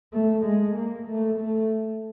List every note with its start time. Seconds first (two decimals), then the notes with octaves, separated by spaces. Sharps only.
0.13 A3
0.44 G#3
0.76 A#3
1.08 A3
1.39 A3